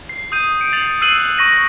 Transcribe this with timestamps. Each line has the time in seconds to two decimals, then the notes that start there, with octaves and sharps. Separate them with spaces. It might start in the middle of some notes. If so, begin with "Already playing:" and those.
0.09 C7
0.32 D#6 G6 D#7
0.61 C#7 D7
0.73 A6 C7 F7 F#7
1.01 E6 F#6 C7 D#7 F#7
1.37 C#6 A#6 D#7